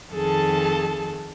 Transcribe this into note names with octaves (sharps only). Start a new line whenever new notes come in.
F2 D#3 G#4 A4 A5